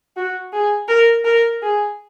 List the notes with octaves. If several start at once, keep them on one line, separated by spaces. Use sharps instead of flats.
F#4
G#4
A#4
A#4
G#4